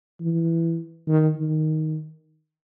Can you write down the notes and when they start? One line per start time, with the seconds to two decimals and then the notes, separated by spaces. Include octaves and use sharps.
0.20 E3
1.08 D#3
1.37 D#3